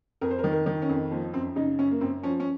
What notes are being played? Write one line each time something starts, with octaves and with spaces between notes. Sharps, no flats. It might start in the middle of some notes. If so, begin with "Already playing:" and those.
F2 A#4
C5
A#4
D#3
A#4
D#3
C#4
F2
F3 A#3
F#2 C4
C#3 D#4
F#2 C#4
A#3
F#2 C4
F3 C#4
C#4